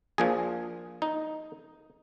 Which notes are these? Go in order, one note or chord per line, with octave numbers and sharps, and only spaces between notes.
A#1 A#2 F3 G#4
D#4